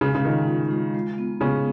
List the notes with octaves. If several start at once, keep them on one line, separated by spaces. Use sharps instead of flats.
C#3 G#3
C#3
D#3 F4
F4
G#3
G#3
B3
C#3 B3 C#4